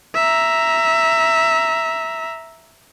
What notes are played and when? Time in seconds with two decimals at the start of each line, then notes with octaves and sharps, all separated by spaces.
0.15 E5 A#5